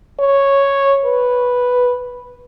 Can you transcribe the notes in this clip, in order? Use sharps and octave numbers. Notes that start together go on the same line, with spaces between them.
C#5
B4